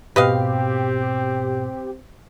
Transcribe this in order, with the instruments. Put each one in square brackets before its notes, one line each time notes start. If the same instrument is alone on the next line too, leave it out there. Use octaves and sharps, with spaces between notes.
[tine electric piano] G#2 B2 [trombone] C4 [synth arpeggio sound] G4 [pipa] B4 D#5 F5